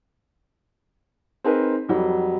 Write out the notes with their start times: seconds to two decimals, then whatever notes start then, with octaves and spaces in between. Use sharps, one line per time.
1.44 C4 D#4 G#4 A#4 B4
1.89 F2 F#3 G3